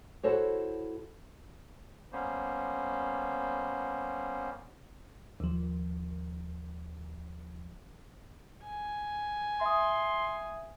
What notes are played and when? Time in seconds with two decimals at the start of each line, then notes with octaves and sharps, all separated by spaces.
0.23 E4 F#4 A4 C5 C#5
2.13 G3 A#3 B3 C#4 C5
5.40 D#2 F3
8.65 G#5
9.61 E5 C6 D#6